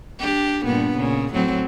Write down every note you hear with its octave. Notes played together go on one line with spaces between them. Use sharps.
D4 G4
G2 A#2 B3
A#2 C#3
A2 F#3 C4